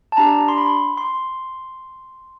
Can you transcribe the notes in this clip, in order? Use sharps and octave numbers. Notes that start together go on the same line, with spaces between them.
A5
D4 G4 A#5
C6
B5
C6